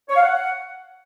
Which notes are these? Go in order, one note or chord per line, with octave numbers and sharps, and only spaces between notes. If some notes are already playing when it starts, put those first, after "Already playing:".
C#5
F5
F#5